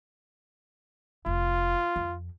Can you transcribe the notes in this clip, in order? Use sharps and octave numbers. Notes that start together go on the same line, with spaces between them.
F1 F4
F2